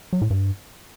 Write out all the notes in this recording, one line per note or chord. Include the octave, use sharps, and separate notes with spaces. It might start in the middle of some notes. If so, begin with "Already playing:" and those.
F#3
A2
G2